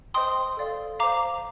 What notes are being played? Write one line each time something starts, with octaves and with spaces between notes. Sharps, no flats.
C5 D#5 G5 C6 D#6
A4 D5 F5
C5 F5 A#5 D6